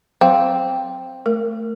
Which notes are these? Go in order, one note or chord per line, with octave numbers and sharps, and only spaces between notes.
F#3 C4 F5
A3 A#4